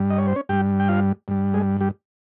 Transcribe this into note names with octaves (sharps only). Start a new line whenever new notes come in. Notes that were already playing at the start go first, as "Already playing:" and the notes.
Already playing: G2 G3
D#5
C#5
C5
C#4 C#5
G2 G3 G4 G5
G5
F4 F5
G2 G3
G#3 G#4
G3 G4